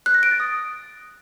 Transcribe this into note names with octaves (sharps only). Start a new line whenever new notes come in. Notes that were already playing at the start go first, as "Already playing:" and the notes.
F#6
A#6
D7
A6
D#6